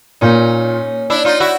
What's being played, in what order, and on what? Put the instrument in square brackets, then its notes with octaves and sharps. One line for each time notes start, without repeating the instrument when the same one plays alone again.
[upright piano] A#2 [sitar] C#4 D#4
[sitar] D4 E4
D#4 F4
E4 F#4